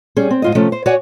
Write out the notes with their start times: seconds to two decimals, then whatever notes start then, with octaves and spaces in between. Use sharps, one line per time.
0.16 G3 C#4 G#4
0.31 C4
0.42 G#2 F4 D#5
0.55 C3 F3 A3 C#4
0.72 C5
0.86 F#4 C#5 D5 F#5 G#5